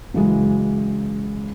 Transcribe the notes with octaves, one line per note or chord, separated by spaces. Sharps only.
C#2 F#2 E3 F#3 G#3